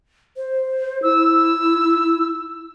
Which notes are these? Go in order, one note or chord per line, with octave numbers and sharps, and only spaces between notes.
C5
E4 E6